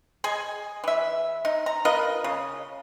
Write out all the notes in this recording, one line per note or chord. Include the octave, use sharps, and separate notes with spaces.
G#4 D#5 G#5
E3 E5
D#4
A#5
F4 A#4 B4 D#5
C#3